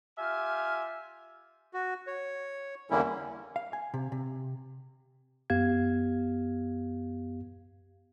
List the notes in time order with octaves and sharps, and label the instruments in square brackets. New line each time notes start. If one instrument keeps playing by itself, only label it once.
[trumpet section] F4 G4 G#5 [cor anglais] E5 [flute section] F6
[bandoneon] F#4
C#5
E2 D3 G3 A#3 C#4 E4
[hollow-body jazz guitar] F5
G#5
C3
C3
[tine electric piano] F#2 B3 G4 F5 G#6